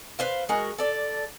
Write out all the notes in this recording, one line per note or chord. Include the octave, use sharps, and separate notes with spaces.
B4 C5 F5
G#3 F#4 A#4
A4 D5